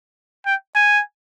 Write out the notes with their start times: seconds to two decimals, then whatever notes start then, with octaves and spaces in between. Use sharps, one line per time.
0.46 G5
0.75 G#5